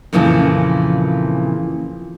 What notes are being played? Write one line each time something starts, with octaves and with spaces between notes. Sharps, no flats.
F2 A#2 C#3 E3 F3